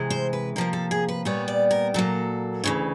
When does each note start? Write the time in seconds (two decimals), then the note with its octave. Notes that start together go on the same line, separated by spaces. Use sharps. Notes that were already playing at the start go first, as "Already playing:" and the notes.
Already playing: C3 E3 G#3
0.10 C5
0.33 B4
0.56 C3 F3 A#3 A#4
0.73 A4
0.91 G#4
1.09 B4
1.25 A#2 G3 B3 C#5
1.48 D5
1.71 A#4
1.94 A#2 F#3 A#3 A4
2.64 D2 C#3 E3